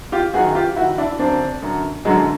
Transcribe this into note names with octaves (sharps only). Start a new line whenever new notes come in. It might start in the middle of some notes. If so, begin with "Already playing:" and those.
F4 G4
F#2 D#3 F#4 G#4
F4 G4
F#2 D#3 E4 F#4
D4 E4
F#2 D3 C4 D4
F#2 D3
F#2 D3 F#3 G#3